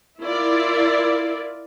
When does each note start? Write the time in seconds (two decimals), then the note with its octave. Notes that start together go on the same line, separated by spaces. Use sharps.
0.22 E4 F4 A#4 D5